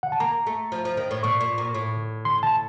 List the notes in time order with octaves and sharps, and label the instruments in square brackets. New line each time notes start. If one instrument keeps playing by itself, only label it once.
[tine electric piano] F#5
A5
[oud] A#3 [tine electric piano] A#5
[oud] A3
F3
F3
D#3
A2
[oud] A#2 [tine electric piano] C#6
[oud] A#2
A#2
A2
[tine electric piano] C6
A5